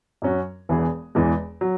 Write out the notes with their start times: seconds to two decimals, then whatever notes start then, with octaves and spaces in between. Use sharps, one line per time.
0.22 F#2 F#3 C#4 F#4
0.69 E1 E2 E3 B3 G#4
1.15 E1 E2 E3 G#3
1.61 F#3